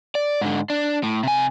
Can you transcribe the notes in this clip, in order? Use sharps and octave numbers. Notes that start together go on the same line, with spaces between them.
D5
G#2 D3
D4
A2
C3 G#5